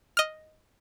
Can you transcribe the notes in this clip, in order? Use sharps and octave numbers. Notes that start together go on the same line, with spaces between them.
D#5 F6